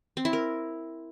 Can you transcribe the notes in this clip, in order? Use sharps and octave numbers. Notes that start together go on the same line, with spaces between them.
C4
E4
A#4